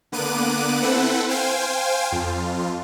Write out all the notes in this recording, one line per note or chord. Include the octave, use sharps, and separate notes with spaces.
D3 A#3 B3 D6 F#6 D#7
C4 E4 A4 B4 F#5
C5 F5 G5 G#5
F2 F4